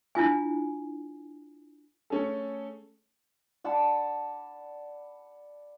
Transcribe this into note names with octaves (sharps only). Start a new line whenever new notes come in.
D4 E4 F4 G#5
A3 C#4 G#4 A4
D5 F#5 A5 B5